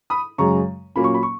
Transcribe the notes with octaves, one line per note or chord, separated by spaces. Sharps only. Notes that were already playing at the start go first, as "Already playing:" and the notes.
B5 D#6
F#2 C#3 G#3 A#5 C#6
A#2 F#3 A#3 C#4 B5
C#6
B5
C#6